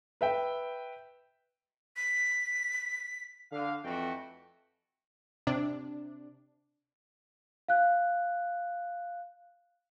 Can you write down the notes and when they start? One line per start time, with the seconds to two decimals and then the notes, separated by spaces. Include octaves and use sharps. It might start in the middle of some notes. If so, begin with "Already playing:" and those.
0.21 B4 E5 G5
1.97 B6
3.52 D3 F5
3.83 F2 E3 A3 F#4 G5
5.47 C3 D4
7.68 F5 F#6